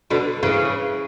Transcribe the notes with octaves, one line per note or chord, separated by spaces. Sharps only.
B2 D3
C#3 E3